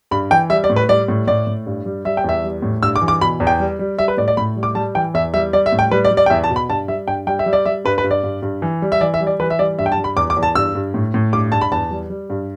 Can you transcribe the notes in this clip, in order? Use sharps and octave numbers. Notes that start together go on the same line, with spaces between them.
G2 B5
E3 G5
G3 E5
D5
A2
B4
G3 D5
A2
A2 D5
A2
G2
G3
G3 E5
G5
E2 E5
G3
A2
G2 E6
D6
E3
D6
B2 B5
E2
G5
G3
G3
G3 E5
B4
A2 D5
D5
A2 B5
G3
D6
G3 A5
E3 G5
E2 E5
G3 E5
G3 D5
E5
A2
G5
G3 B4
D5
G3
D5
G5
E2 E5
A5
B2
B5
G2 A5
G3 E5
G2 G5
G3 G5
E5
G3
D5
G3 E5
G2 B4
B4
G2
D5
G2
G2
E3
G3
E5
E3 D5
E5
G3
D5
E3 B4
E5
G3 D5
G2 E5
G5
A5
G3
B5
E2 D6
D6
E2
A5
G2 E6
G2
A2
A2
G2 D6
G2 A5
B5
E2 A5
G3
G3
G2